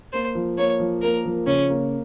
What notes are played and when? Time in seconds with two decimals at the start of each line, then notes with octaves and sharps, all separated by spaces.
0.13 A#3 C5
0.35 F3
0.57 A#3 C#5
0.79 F3
1.02 A#3 A#4
1.25 F3
1.47 C#3 C#4
1.69 A#3